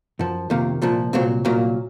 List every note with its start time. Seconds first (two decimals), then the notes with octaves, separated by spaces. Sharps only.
0.19 F#2 F3
0.50 F2 C3 D#3 A#3
0.82 C2 A#2 F3
1.13 C2 A#2 F#3 C4
1.45 C2 A#2 F#3 A#3